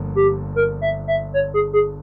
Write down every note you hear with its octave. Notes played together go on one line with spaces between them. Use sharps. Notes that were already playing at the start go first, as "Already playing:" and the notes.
Already playing: G1 G2 F3 A#3
G4
A#4
E5
E5
C#5
G#4
G#4